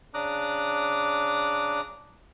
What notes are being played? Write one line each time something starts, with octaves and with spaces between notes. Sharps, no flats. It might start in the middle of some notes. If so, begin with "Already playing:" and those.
C#3 D4 A#5 D6 D#6 F#6